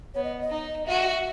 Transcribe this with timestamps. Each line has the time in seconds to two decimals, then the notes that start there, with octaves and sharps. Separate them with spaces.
0.14 B3 C#5
0.24 D#5
0.41 D#5
0.50 D#4
0.86 F#4 E5